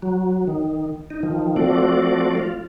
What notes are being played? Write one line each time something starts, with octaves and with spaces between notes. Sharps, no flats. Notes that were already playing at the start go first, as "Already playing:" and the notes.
F#3
D#3
D#4
D#3 F3
F3 A3 C4 F#4 D5
F4